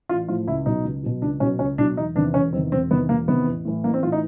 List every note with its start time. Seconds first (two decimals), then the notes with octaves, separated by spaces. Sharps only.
0.09 A1 F4
0.28 A2 F3 F4
0.47 C#2 E4
0.66 B2 F#3 D#4
0.85 C#2
1.03 B2 F#3
1.22 C#2 D4
1.40 B2 F#3 C#4
1.59 C#2 C#4
1.78 B2 F#3 D4
1.96 E1 D#4
2.16 E2 C3 D#3 D4
2.34 E1 C#4
2.53 E2 C3 D#3 C4
2.72 E1 C4
2.91 E2 C3 D#3 B3
3.09 E1 A#3
3.28 E2 C3 D#3 B3
3.47 A1
3.65 A2 E3
3.84 A1 A#3
3.94 C4
4.02 A2 E3 F4
4.12 D#4